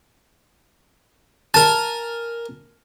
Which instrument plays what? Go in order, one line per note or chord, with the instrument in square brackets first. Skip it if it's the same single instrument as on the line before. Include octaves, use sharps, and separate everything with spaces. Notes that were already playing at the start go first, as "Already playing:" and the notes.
[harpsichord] A#4 G#5 [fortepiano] A5